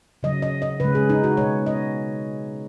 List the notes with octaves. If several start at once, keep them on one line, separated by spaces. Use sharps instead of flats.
C#3 F#3 D#5
D#5
D#5
C#3 G#3 B4
G#4
D#4
F#4
B2 G#3 C#5
D#5